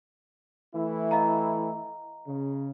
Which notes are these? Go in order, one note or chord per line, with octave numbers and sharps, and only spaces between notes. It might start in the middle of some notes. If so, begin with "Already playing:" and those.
E3 A3 E4
D#5 F5 A#5
C#3